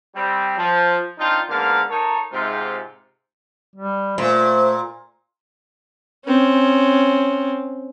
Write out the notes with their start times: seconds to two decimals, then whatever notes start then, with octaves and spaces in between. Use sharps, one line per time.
0.16 G3 C4
0.58 F3
1.19 C4 D4 D#4 F4
1.50 G#2 D3 A#3 B3 F5
1.90 D#4 A4 A#4 C#5
2.32 G#2 C3 F4
3.76 G3
4.18 A#2 A3 C5
6.26 C4 C#4